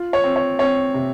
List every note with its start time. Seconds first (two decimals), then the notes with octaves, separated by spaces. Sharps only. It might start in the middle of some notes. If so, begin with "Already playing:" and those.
Already playing: F4
0.13 C#5
0.24 C4
0.36 C#5
0.59 C4 C#5
0.94 C3